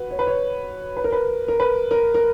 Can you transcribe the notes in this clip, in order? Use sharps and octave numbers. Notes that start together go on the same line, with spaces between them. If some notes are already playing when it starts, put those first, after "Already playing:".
Already playing: F#4 B4
C#5
B4
C#5
B4
A#4
B4
A#4
B4
A#4
A#4